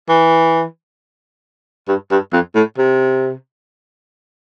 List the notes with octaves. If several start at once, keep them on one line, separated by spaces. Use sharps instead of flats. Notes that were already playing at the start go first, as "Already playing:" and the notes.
E3
G2
G2
F2
A2
C3